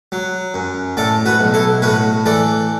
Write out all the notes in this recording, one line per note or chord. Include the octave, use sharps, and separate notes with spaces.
F#3
F#2
A2 A4 D5
F#4 B4
B1
E4 A4
A2 F#4 B4
E3 A4 D5